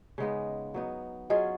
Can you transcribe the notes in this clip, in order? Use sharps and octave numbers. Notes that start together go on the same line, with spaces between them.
C#3 G#3 B3 D#4
F#3 B3 D#4
F#3 C#4 F4 G#4 D#5